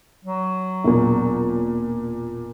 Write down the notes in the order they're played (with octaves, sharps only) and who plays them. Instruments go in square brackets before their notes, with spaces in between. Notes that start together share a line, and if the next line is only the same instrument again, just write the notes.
[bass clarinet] F#3
[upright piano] E1 A#2